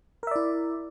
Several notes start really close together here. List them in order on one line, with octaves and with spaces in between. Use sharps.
A#4 E5 D5 E4